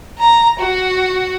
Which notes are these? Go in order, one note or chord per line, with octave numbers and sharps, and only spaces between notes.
A#5
F#4